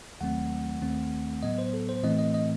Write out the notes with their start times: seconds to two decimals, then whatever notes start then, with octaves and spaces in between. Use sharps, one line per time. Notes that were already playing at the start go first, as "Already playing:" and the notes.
0.21 D#2 D#3 F#3 A3 C4 F#5
0.82 D#2 D#3 A3 C4
1.43 A2 F#3 B3 D#5
1.58 C5
1.73 A4
1.89 C5
2.04 A2 E3 A3 C4 D#5
2.19 D#5
2.34 D#5